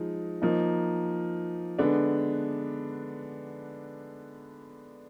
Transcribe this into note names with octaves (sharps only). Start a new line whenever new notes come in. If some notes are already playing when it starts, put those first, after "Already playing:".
Already playing: F3 G#3 D#4
F3 A#3 D#4
D3 G#3 B3 D4